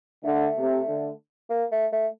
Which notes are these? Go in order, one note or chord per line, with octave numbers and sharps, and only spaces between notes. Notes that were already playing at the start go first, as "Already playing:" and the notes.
D3 A3
C3
D3
A#3
A3
A3